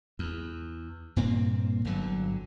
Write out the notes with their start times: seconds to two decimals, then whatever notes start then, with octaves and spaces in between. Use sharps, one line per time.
0.19 E2
1.16 G2 A#2 A#3 C4
1.85 G1 D3 F#3